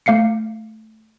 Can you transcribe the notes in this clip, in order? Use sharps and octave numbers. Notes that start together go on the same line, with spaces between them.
A3 F5 C7 C#7